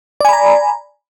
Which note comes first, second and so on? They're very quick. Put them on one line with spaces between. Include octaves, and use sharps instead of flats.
D5 G#5 B5 A#5